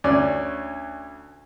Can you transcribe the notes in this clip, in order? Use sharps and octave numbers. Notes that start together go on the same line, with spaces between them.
D2 C#4 D5